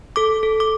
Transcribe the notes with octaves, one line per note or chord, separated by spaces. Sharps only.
A4 D6
A4
D6